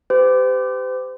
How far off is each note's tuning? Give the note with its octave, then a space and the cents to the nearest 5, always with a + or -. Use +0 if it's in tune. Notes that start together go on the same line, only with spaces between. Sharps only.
G4 +0 C5 -45